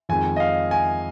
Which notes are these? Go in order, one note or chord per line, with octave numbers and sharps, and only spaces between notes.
F2 D#3 G#3 C4 G#5
D#5
F5
G#5